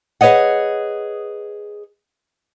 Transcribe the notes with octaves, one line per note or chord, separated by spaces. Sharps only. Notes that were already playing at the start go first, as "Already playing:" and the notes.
G#4 B4 C#5 D#5 F#5